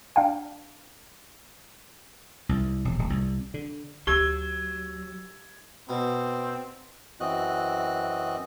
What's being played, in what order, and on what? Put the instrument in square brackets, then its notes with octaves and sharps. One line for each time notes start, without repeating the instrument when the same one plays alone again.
[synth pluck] D4 F5 G5
[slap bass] C2
E1
D1
C2
D3
[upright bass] D2 [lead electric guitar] F#3 [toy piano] G4 [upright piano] E6 G#6 G7
[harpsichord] B2 [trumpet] C4
[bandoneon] F#2 E3 C4 F#4 D#5 F#6